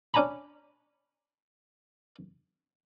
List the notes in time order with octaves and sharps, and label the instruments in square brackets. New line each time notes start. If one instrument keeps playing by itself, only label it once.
[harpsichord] C#4 D4 G#5 A#5 B5